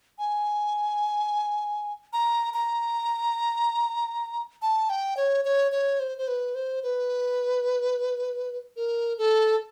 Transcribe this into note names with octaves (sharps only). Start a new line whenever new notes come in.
G#5
A#5
A#5
A5
G5
C#5
C#5
C#5
C5
C5
B4
C5
B4
A#4
A4